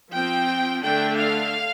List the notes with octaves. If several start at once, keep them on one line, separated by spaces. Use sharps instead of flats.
F3 C4 G5
D3 A3 D4 G5
F5